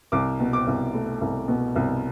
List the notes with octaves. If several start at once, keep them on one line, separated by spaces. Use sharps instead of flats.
C2 D6
B2
D6
C2
A3
C2
B2
C2